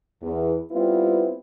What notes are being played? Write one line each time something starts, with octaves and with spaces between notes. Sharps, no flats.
E2
G3 B3 C4 E4 F4 B4